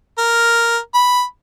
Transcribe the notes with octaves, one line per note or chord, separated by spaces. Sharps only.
A#4
B5